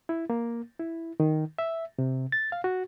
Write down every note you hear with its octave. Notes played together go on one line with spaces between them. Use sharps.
E4
A#3
E4
D#3
E5
C3
A6
F5
F#4